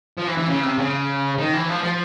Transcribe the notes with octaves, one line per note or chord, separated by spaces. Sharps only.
F3
E3
E3
C#3
C3
C#3
D#3
E3
F3
F3